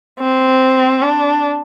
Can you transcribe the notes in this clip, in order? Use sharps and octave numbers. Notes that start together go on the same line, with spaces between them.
C4
D4